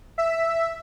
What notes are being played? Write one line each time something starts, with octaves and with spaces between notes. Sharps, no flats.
E5